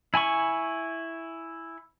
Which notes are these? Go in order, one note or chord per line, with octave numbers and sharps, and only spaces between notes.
E4 G#5 B5 C#6